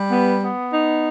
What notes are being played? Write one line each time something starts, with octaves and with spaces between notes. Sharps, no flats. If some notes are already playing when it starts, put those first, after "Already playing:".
Already playing: G3
B3
B3
D#4